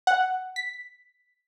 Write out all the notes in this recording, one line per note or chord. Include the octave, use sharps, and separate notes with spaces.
F#5
B6